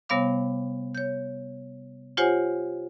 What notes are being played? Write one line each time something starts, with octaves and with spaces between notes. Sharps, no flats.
C3 G3 B3 C#5 F5 D6
C#5 G6
F4 G4 C5 C#5 F#5 G#5